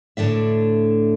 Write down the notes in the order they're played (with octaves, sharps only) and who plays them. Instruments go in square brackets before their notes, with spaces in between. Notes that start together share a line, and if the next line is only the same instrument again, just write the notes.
[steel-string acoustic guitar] D2 A2 D3 D4 E5